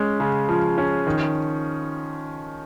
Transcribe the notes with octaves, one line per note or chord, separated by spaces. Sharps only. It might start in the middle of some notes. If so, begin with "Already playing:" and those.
Already playing: G#3 C#4
C#3
F3
C#4
D#3